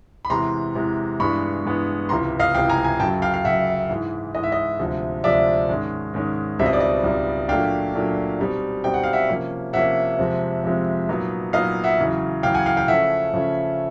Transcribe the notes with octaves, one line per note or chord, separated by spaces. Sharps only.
B5
E2 C3 E3 G#3 A#5 C6
E2 C3 E3 G#3
G2 E3 G#3 B3 B5 C#6
G2 E3 G#3 B3
C#2 C3 E3 A#5 C6
D#5 F5
C#2 C3 E3 F5 G5
G#5 A#5
G#5 A#5
F#2 C#3 F#3 G5 A5
F5 G5
F5
F#2 C#3 F#3 E5 F#5
G#2 E3 G#3
G#2 E3 G#3 D#5
E5
D#5
D2 C3 F3 G#3
D2 C3 F3 G#3 D5 E5
G#2 D#3 G#3 C#4
G#2 D#3 G#3 C#4
C#2 B2 G3 C4 D#4 E5
D#5
D5
D#5
C#2 B2 G3 C4 D#4
A#2 F#3 A3 D4 F5 G5
A#2 F#3 A3 D4
B2 G3 C4 D#4
B2 G3 C4 D#4 G5
F#5
F5
E5 F#5
C3 F3 A#3 C#4
C3 F3 A#3 C#4 E5 F#5
F2 C3 F3 G#3 C4
F2 C3 F3 G#3 C4
A#2 F#3 B3 D#4
A#2 F#3 B3 D#4 D#5 F5
E5 F#5
E2 C#3 F#3
E2 C#3 F#3 F5 G5
F#5 G#5
F5 G5
F5 G5
C#3 F3 A3 C#4 E5 F#5
C#3 F3 A3 C#4